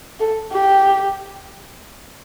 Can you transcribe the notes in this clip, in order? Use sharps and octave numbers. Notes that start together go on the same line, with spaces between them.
A4
G4